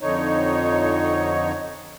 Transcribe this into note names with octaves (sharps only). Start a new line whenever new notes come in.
F2 D3 D#4 C#5